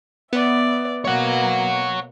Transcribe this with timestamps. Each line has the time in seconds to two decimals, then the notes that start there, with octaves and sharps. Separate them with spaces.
0.33 B3 D5 E5
1.05 B2 A#3 F#4 C#5 F#5